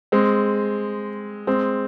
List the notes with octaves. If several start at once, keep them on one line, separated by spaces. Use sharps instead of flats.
G#3 C4
G#3 C4